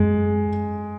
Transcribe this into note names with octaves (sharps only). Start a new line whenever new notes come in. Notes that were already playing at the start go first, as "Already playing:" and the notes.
Already playing: F#2 G#3